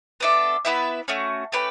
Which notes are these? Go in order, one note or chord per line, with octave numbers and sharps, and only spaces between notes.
B3 D4 A4 E5
B3 E4 B4 E5
A3 C#4 F#4
A3 C#4 G4 B4